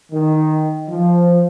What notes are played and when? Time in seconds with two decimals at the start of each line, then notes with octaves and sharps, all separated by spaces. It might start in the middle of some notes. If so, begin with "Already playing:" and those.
0.12 D#3
0.89 F3